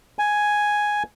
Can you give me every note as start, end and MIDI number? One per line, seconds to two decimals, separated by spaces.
0.19 1.03 80